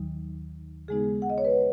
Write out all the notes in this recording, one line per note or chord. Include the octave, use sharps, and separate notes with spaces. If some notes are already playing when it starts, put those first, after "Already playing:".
Already playing: D#2 D#3 F#3 D#4
C#3 G#3 B3 D#4 G#4
F#5
D#5
C#5
B4